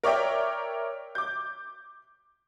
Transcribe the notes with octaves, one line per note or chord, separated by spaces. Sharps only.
A#4 C#5 D5 E5 G5
D6 G6